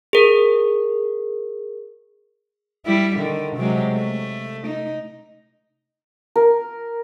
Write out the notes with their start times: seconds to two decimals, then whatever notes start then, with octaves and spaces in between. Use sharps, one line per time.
0.13 G#4 A#4
2.86 G3 E4
3.17 D3 D#3
3.57 C3 F#3 G#3
3.92 A3
4.67 D#4
6.36 A#4